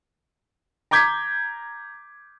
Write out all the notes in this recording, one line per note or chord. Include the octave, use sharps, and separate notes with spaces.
A#5 D6 G6 G#6 B6